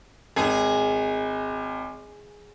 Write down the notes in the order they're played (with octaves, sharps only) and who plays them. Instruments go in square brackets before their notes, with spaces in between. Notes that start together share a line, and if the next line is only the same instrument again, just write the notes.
[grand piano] G#1 [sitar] G#4